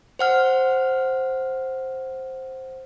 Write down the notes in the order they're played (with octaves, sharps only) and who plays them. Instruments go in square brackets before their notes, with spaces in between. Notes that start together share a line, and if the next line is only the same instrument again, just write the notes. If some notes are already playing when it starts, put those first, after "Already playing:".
[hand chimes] C5 F#5 F6